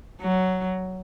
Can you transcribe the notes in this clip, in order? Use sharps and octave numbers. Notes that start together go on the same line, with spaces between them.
F#3